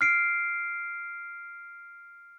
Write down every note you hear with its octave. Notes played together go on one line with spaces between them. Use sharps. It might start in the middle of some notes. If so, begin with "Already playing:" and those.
F6 C7 D7